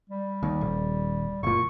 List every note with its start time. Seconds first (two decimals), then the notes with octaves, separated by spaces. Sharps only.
0.10 G3
0.43 D#2
0.61 D#1
1.43 F#1 A#2 C#6